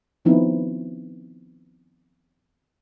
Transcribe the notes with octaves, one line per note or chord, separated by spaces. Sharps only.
D#3 F3 B3 C4 D#4 E4